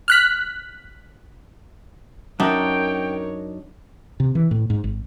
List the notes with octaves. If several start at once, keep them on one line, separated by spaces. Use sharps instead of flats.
F6 F#6 B6
F#2 D4 D#4 A#4 C#5 G5
C3
E3
A2
G#2
G#1